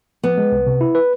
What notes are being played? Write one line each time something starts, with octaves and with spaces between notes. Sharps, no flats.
F3 B3
G#3
C2
C3
E4
B4